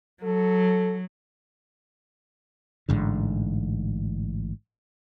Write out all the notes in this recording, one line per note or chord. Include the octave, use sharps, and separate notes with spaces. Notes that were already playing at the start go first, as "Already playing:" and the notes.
F#3 A4
A1 G#2 D3